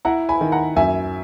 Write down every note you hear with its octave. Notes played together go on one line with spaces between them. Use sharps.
E4 F#5 A#5
G#5 B5
D#3
F#5 A#5
F#2 E5 G#5